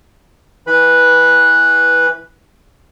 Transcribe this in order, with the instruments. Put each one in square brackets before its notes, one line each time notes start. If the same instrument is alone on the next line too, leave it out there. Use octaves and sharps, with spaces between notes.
[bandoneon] E3 B4 B5